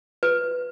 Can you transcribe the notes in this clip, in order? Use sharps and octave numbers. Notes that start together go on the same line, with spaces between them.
B4